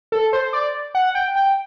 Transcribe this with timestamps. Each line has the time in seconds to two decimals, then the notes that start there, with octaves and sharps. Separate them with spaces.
0.12 A4
0.33 C5
0.53 D5
0.95 F#5
1.15 G5
1.35 G5